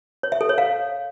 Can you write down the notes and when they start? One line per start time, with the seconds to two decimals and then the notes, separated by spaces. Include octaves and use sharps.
0.23 C#5
0.32 E5
0.41 A4
0.49 C#5
0.58 F5